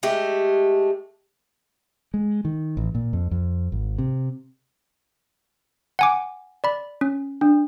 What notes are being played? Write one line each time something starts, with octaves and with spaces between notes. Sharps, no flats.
G#3 A3 G4
G#3
D#3
A1
A#2
F2
F2
G#1
C3
F#5 G#5 D6
D5 B5
C#4
D4